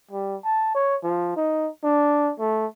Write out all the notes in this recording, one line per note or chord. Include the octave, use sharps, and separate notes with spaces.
G3
A5
C#5
F3
D#4
D4
A3